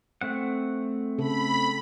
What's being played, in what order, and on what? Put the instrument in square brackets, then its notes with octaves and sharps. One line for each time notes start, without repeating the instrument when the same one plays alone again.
[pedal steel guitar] A3 C4 F#5
[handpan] C#3 A4 [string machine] B5